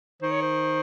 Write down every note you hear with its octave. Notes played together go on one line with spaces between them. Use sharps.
D#3 C5
C#5
C5